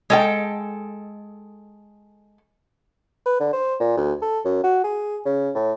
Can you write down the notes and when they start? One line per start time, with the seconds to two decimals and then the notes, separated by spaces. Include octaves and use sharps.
0.10 G#3 A4 G5
3.26 B4
3.40 D3
3.53 C5
3.80 A#2
3.97 D2
4.22 A4
4.45 F#2
4.64 F#4
4.84 G#4
5.26 C#3
5.55 A2